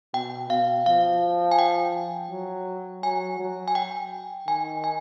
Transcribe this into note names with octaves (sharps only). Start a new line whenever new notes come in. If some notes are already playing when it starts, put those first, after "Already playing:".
B2 G5
B2 F5
F3 F5
G#5
G5
F#3
F#3 G#5
F#3
G#5
G5
D#3 G#5
G#5